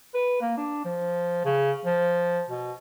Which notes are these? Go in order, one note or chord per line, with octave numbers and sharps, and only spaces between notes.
B4
A#3
D4
F3
C#3
F3
B2